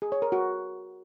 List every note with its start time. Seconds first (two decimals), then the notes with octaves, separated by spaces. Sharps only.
0.02 G#4
0.12 C#5
0.22 A#4
0.32 F#4